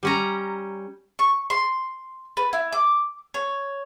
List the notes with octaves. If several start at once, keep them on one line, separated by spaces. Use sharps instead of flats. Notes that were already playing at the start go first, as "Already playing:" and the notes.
G3 C#4 A#5
C#6
C6
B4
E4
D6
C#5